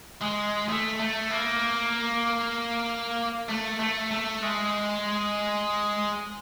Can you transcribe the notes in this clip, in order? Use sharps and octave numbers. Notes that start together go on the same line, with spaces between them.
G#3
A3
A3
A#3
A3
A3
A3
G#3